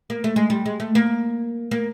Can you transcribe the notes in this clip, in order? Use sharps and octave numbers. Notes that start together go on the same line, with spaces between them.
A#3
A3
G#3
G3
G#3
A3
A#3
A#3